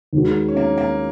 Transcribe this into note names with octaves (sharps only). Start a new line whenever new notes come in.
D#2 D#3 G#3 F#4
C#4
A#3
A#3